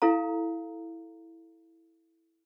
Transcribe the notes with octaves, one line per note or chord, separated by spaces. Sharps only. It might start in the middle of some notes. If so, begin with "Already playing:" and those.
E4 A4 F5 A#5